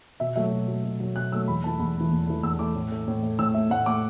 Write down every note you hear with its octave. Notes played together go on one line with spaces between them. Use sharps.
B2 E5
F#3 A3 E5
B2
F#3 A3
B2
F#3 A3
B2 F#6
F#3 A3 E6
E2 B5
E3 A3 A5
E2 B5
E3 A3
E2
E3 A3
E2 E6
E3 A3 D6
A2
A3
A2
A3
A2 E6
A3 E5
A2 F#5
A3 D6